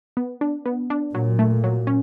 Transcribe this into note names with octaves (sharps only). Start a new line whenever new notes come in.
B3
D4
B3
D4
A#2 F#3
A3
F#3
C#4